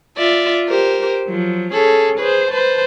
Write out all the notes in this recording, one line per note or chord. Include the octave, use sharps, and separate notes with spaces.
F4 D5 E5
G4 A#4 C5
F3 F#3
C#4 G#4 A4
G#4 B4 C5
B4 C5 A5